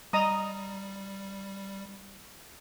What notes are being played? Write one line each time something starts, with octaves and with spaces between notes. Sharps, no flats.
G3 D#5 A#5 D#6